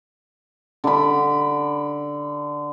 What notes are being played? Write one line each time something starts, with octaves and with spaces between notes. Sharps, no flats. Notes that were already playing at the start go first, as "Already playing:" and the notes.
D3 B5